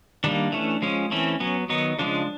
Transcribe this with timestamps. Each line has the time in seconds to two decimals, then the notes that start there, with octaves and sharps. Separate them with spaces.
0.24 D#3 G3 A#3 D4
0.52 E3 A3 C#4
0.82 F3 G#3 C#4
1.11 E3 A3 C4 C#4
1.40 F#3 B3 C#4
1.69 D#3 F#3 B3 D#4
1.99 C#3 F3 G#3 D4